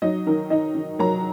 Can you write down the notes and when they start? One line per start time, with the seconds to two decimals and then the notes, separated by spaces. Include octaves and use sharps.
0.02 F#3 D#4 D#5
0.26 D#3 A#4
0.50 D#3 D#4 D#5
0.75 D#3
0.99 F#3 A#4 A#5